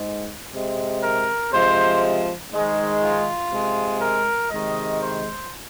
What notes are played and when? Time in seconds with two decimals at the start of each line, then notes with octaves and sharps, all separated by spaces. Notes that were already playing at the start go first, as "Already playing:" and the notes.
Already playing: G#2 G#3
0.53 C3 G#3
1.02 A#4
1.52 C3 F3 G#3 C5
2.52 G#2 D#3 G#3
3.02 F4
3.51 C3 G#3
4.01 A#4
4.51 C3 D#3 G#3 D#5
5.00 C5